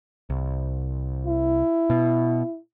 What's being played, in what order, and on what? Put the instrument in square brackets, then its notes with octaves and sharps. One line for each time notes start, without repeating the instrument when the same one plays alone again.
[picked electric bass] C2
[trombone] E4
[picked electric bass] B2